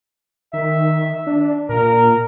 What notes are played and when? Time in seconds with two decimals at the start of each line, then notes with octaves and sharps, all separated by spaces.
0.53 D#3 E5
1.27 D4
1.69 A#2 A#4